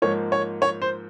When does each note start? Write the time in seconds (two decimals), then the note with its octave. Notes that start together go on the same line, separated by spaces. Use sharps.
0.02 G#2 F3 A#3 C#5
0.32 C#5
0.62 C#5
0.82 C5